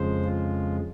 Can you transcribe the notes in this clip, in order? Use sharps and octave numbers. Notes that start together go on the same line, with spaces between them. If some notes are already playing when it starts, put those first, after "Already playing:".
Already playing: F2 C#3 F3 G#3 C5
F4